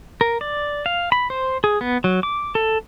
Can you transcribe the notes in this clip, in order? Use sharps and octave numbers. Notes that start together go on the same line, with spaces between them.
A#4
D5
F5
B5
C5
G#4
B3
F#3
D6
A4